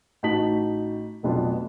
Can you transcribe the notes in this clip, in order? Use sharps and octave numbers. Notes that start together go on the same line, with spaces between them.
A1 D#4 F#4 A5 B6 F#7
F1 B1 F2 B3 D4 F4